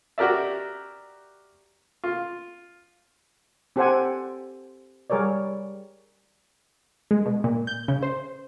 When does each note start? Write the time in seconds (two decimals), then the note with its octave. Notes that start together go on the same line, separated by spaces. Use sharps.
0.18 F#4 G4 A#4 D5 E5
2.04 F4
3.76 C4 G4 A4 C5 F#5 G#5
5.10 G3 G#4 A#4 C#5 D5
7.11 G#3
7.26 B2
7.44 A#2
7.67 G6
7.88 C#3
8.02 C5